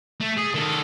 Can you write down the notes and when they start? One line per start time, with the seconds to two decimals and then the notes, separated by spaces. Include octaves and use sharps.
0.21 A3
0.37 G#4
0.54 D#3 A4